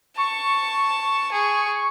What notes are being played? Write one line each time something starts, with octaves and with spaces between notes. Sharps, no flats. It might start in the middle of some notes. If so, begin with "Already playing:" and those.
A5 C#6
G#4